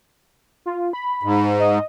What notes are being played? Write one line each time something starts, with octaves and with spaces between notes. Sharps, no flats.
F4
B5
G#2
D#5